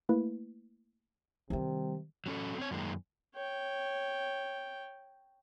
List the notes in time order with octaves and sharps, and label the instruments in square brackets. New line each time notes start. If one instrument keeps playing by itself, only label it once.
[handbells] A3 A#3 E4 B4
[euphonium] C3 [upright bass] D#3 G3
[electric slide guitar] F#3 C#4 A4
C4 C#5
F#2 D#3 G#3 A#3
[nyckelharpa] C#5 G5